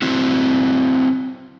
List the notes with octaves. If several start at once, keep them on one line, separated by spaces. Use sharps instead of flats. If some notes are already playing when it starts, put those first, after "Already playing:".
C4 E4 F#4